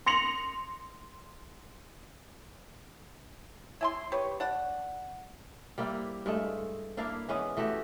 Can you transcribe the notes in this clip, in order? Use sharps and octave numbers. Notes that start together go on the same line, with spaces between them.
C6 A#6 C#7 F7 F#7
E4 G#5 C6
G4 B4 C#5
D4 F#5
G3 A#3 C4 E4
G2 G#3 A3
A#3 D4 E4 F5
E3 G#3 B3 C#4
E3 A3 F#4 G4